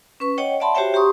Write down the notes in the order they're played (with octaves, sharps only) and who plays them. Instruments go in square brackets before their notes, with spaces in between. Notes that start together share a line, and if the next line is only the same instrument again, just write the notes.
[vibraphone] C#4 B4 C#6
C#5 D#5 F#5 G5
D5 E5 F#5 A5 B5 C6
F#4 G4 C5 C#5 E5 G5
G4 A#5 C6 C#6 D#6